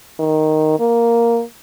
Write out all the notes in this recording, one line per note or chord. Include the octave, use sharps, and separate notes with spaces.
D#3
A#3